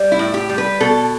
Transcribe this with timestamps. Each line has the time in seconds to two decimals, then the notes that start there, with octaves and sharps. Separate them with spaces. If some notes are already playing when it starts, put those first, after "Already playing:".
Already playing: G3
0.12 E4
0.19 A2
0.34 G4
0.49 G3
0.58 B4
0.80 B2 A4